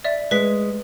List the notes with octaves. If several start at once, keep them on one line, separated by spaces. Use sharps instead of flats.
D5 E5
G#3 B4 B6